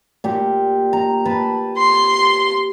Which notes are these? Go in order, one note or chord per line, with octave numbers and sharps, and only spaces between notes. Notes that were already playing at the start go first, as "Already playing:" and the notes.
A#2 G4
A#5
B4 A5 B5
C6